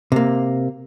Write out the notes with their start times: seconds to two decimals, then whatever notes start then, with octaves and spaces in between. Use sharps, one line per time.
0.12 C3 A#3